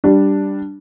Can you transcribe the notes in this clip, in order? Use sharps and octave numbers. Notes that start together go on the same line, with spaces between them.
G3 D4